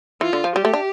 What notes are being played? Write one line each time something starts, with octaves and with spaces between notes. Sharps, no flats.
E3 F4
D3
F3
G3 G4
A3
D4